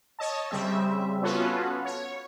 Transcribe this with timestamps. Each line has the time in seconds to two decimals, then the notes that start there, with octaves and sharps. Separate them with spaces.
0.19 C#5 D#5 A5
0.51 C#3 G3 C4 E5
1.22 B3 C#4 F4 F#4 A4 B4
1.85 C#5